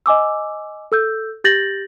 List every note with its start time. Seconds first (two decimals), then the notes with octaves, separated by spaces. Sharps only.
0.06 D#5 G#5 D6 E6
0.92 A4 E6 G6
1.44 G4 G6 A6 A#6 F#7